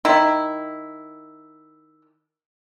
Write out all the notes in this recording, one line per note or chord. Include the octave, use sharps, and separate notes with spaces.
D#3 E4